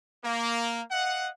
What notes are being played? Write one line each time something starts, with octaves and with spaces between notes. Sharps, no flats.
A#3
D#5 F5 F#5